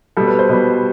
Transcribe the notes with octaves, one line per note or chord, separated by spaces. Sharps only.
B2 G3 A4
B4
C5
B2 G3 B4